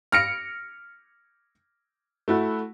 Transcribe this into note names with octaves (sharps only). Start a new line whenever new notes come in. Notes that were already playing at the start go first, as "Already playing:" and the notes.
F6 A#6 C#7 D7
A3 E4 F#4